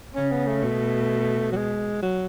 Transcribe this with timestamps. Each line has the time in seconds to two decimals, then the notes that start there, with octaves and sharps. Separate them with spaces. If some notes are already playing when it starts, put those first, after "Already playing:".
0.15 C#3 C#4
0.31 B3
0.47 A3
0.62 B2
1.52 F#3
1.56 G#3
2.02 F#3